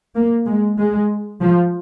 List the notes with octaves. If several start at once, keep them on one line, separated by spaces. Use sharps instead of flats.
A#3
G#3
G#3
F3